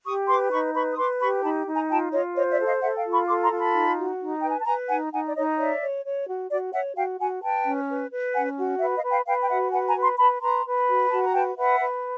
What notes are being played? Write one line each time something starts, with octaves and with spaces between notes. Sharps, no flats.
G4 C#6 D#6
B4 C6 D6
D#4 B5 C#6
B4 B5 C#6
D#6
B4 C6 D6
G4 B5 C#6
D#4 A5 B5
D#4
G#5 A#5
F4 G5 A5
F4 C#5 D#5
C5 C#5 D#5
D5 E5
A4
D#5 F5
A4 E5 F#5
F5 G5
F4
B5 C#6
A4 C6 D6
A#5 C6
F4
A5 B5
D#4
F#4
D#4
B4 G5
G#5
A5
B4 G#5 A#5
D#4 F#5 G#5
D#4 F#5 G#5
D5
D#4 C#5 D#5
C#5 D5 E5
C#5
C#5
F#4
F#4 D5
C#5 E5 F#5
F#4 F5 G5
F#4 F#5 G#5
B4 G5 A5
C#4
B4
B4
C#4 F#5 G#5
F#4
B4 E5 F#5
D#5 F5
B4
F5 G5
B4 F5 G5
G5
F#4 E5 F#5
B4 F#5 G#5
G#5 A#5
B4
A#5 C6
B4 A5 B5
B4 A#5 C6
B4
F#4
F#4 A5 B5
A#5
B4 G5 A5
B4 E5 F#5
B4